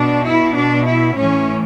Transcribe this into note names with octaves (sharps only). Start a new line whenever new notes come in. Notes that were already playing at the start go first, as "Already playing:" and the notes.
Already playing: B2 D4
E4
D4
E4
A2 E3 C#4